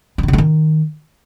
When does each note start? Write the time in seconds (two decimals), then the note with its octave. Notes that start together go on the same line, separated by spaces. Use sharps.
0.18 E3
0.23 D#3
0.28 C#3
0.33 A3
0.38 D#3